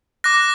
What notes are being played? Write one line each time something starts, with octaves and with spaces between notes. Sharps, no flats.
D6 F#6 A#6